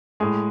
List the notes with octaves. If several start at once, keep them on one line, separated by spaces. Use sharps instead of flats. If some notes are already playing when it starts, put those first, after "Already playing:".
A2 G#3 G#4